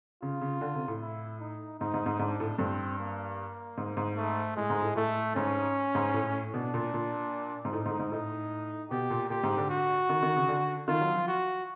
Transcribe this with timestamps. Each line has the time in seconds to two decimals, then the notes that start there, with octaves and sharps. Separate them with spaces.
0.22 C#3 F4
0.41 C#3
0.61 D3
0.75 C3
0.88 A2
1.02 E4
1.40 D#4
1.80 G#2 D#4
1.94 G#2
2.06 G#2
2.19 G#2 D4
2.40 A2
2.59 G2 C4
2.99 A#3
3.77 G#2
3.97 G#2
4.17 A3
4.56 A2 G#3
4.70 G#2
4.82 A2
4.96 A2 A3
5.36 G#2 C#4
5.95 G#2
6.14 A2
6.54 B2 D4
6.74 A#2
6.94 A#2
7.65 G#2
7.72 A2 D#4
7.86 G#2
7.99 G#2
8.12 A2 D#4
8.91 B2 G4
9.10 A#2
9.30 A#2 G4
9.43 G#2
9.57 D3
9.70 F#4
10.09 D#3
10.23 D#3
10.36 C#3
10.48 D3
10.88 D#3 F4
11.01 F#3
11.15 F3
11.28 F#4